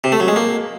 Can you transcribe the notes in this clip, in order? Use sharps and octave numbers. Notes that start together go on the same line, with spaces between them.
C3
A3
F#3
G#3
A#3